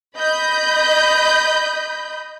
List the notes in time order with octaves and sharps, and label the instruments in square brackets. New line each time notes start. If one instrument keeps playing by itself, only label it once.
[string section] D#5 B5 G6